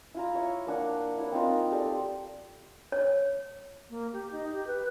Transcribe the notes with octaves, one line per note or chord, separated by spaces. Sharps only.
E4 F4 A#5
C#5 E5
A#3 D4 F#5
E4 C#5
C4 D#4 F4 A#4
G4 A4 D5
C#5
A#3
G4
D#4
G4
B4